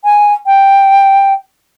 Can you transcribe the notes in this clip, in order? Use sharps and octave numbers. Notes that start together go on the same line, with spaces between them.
G#5
G5